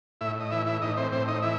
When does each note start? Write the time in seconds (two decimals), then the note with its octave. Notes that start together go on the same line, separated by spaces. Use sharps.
0.21 A2 E4 E5
0.40 D#5
0.51 E3 E4 E5
0.66 E4 E5
0.81 A2 D#4 D#5
0.97 C4 C5
1.12 A2 C4 C5
1.28 D#4 D#5
1.42 E3 E4 E5